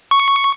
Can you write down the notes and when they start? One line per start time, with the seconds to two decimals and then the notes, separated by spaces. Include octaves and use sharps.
0.11 C#6